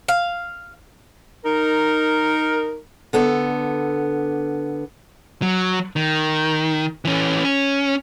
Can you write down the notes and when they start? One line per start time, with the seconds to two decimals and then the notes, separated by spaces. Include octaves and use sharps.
0.08 F5
1.44 D#4 A#4
3.13 D3 B3 A4
5.42 F#3
5.96 D#3
7.05 E3 C#4
7.45 C#4